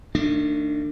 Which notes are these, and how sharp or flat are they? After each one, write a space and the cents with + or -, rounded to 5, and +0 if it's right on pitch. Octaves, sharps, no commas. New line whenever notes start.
D#3 +0 A3 +45 D4 +15